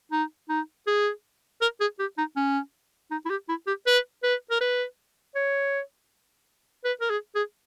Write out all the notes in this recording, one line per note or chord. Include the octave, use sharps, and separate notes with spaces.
D#4
D#4
G#4
A#4
G#4
G4
D#4
C#4
D#4
E4
G4
E4
G4
B4
B4
A#4
B4
C#5
B4
A#4
G#4
G#4